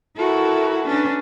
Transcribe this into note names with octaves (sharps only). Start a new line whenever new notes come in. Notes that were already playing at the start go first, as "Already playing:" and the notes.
E4 F#4 A4 A#4
C#4 D4 B4